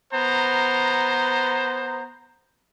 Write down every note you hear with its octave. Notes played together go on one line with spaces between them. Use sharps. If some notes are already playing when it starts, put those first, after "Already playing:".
B3 C5 A#5